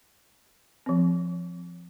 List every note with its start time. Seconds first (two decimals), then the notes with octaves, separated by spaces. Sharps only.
0.86 F3 C4